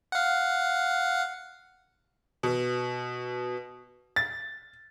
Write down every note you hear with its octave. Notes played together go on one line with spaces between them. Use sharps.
F5 F#5
B2
A6